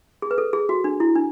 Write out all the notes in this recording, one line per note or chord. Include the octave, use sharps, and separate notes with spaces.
G#4
B4
A4
G#4
F#4
D4
E4
D4